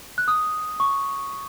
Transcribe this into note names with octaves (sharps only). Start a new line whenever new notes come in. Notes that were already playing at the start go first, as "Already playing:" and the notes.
F#6
D#6
C#6